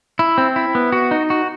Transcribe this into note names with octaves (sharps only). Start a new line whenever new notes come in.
E4
C4
E4
B3
F#4
D#4
F#4